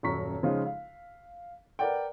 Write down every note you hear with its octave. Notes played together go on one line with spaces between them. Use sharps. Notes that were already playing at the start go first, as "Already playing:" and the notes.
D#1 F#2 A#5 C#6 B6
C#3 F3 G#3 C#4 D#4 F4
F5
A#4 B4 D5 F#5 G5